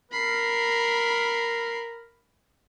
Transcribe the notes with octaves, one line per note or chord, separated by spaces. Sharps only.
A#4 B5 C7